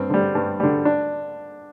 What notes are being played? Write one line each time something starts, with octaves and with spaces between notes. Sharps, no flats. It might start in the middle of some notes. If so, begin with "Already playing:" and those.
Already playing: G2 C4
D3 G3
G2
D3 G3
D4